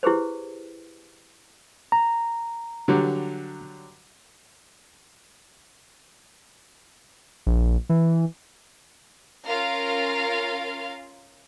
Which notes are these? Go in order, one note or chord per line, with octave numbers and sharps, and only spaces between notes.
E4 G4 G#4 B4 C5
A#5
D3 F#3 G3
A#1
E3
C#4 F4 A#4 F5